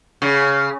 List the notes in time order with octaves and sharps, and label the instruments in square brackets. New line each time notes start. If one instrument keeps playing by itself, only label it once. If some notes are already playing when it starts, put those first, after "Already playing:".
[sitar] C#3